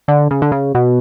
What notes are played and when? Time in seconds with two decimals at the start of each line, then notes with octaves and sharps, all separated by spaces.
0.08 D3
0.31 C#3
0.42 D3
0.52 C#3
0.75 B2